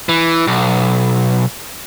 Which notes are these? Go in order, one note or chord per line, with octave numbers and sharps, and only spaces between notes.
E3
B1